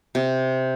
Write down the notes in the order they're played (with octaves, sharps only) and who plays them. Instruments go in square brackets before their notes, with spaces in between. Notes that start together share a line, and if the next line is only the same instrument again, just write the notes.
[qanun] C3